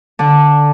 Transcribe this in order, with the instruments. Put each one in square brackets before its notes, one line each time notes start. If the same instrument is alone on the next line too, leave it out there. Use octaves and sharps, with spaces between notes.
[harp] D3 D4